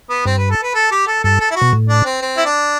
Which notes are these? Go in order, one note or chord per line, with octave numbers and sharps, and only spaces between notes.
B3
G2 C4
B4
A4
B4
A4
G4
A4
G2 A4
A4
E4
F#4
B2
A2
D4
C4
C4
E4
D4